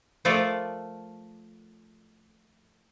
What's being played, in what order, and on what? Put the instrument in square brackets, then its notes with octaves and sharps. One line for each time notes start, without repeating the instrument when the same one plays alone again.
[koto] F3 A3 F4 A4 A#4 D5